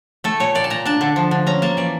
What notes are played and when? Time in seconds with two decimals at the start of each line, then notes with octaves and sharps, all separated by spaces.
0.24 A3 A4
0.40 A#2 C#5
0.55 A#2 D5
0.64 A5
0.70 A#2 A#5
0.85 D4 A5
1.01 D3
1.16 F3
1.31 D3
1.46 C#4 A#5
1.62 A#3 A5
1.77 E3 D5